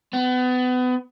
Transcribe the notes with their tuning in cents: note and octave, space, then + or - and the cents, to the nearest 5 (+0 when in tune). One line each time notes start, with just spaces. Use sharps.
B3 +30